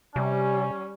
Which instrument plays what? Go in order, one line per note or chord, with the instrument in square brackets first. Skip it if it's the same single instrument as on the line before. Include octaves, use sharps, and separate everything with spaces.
[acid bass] C3 [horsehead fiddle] G3 [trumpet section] C#4